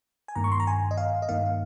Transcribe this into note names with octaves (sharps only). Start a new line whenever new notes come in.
G#5
G2 D#3 A#3 A#5
C#6
C6
A#5
G#5
D#5
F5
D#5
G2 D#3 A#3 F5